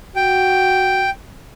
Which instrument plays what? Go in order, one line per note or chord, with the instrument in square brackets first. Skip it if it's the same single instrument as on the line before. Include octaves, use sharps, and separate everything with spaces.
[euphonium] F#4 [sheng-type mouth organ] G5